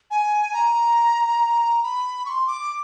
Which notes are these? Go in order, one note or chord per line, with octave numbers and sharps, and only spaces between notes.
G#5
A#5
B5
C#6
C6
D6